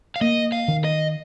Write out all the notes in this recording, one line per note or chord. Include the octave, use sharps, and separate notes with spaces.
F5
A#3 D#5
F5
D#3
D#5